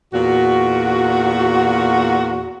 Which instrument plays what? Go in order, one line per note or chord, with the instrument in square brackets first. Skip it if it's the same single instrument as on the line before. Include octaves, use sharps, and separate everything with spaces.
[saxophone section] E2 A#2 F#4